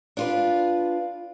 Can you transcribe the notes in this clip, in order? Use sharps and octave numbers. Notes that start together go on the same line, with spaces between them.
D4 F4 B4